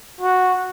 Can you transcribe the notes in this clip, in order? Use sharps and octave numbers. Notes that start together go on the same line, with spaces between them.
F#4